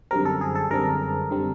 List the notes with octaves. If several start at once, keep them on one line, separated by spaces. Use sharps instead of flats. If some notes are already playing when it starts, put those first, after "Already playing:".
F#2 D3 G3 C4 A#4
A4
G#4
A4
F#2 D3 G3 C4 A#4
D3 G3 C4